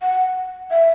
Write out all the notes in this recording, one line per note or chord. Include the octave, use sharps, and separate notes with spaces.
F#5
E5